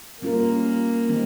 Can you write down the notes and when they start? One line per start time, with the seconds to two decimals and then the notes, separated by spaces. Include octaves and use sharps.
0.22 G3 A#3 C#4 F4 A#4
1.09 D#3 G3 C4 D#4